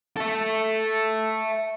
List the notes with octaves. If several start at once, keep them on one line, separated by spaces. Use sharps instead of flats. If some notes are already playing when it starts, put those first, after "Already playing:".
A4 E5